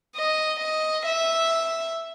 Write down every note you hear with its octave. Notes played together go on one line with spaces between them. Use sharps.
D#5
D#5
E5